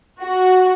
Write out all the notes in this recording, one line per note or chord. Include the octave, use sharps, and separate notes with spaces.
F#4